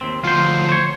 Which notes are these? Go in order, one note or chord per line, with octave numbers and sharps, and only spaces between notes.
D#2 C4
D2 F3 F4 C5
C5 C#5